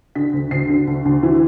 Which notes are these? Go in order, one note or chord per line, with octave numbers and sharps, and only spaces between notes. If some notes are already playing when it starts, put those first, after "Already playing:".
D3 B6
D2
D2 C7
D3
D2
D2
E3